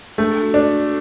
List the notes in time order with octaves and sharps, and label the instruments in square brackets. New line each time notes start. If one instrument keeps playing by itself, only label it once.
[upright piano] A3 [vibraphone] D4
[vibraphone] F#4
[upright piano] D4
[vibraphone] A4